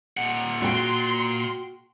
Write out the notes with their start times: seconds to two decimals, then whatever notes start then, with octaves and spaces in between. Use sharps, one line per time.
0.17 A#2 F#5
0.62 F#4 G5 C6